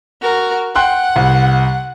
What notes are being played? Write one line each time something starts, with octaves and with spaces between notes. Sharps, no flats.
F#4 A#4
F#5 G5 C6 F#6
C2